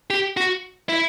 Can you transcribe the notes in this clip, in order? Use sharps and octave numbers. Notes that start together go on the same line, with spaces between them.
G4
F#4
E4